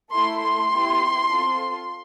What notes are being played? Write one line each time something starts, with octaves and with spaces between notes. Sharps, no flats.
A3 E4 A4 C6
C6
B3 E4 G4
C4 F4 A4